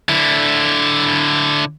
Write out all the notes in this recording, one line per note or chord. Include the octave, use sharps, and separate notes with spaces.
D3 E4